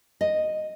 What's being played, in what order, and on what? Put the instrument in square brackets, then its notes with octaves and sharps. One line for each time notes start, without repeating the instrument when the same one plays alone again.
[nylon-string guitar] D#5